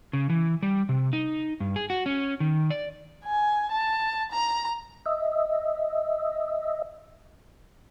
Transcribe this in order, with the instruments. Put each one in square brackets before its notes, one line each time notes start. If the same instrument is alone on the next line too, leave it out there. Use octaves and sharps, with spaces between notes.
[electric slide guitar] C#3
E3
G3
C3
D#4
G2
G#4
F#4
C#4
D#3
D5
[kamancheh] G#5
A5
A#5
[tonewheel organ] D#5 E5